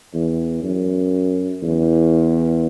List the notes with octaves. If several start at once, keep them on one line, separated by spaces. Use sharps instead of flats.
E2
F#2
E2